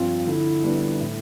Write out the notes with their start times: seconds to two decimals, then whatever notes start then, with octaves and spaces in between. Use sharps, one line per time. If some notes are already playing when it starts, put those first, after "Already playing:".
Already playing: G2 F3 C4 F4
0.27 D3 E4
0.64 G3 B3 D4
1.01 A2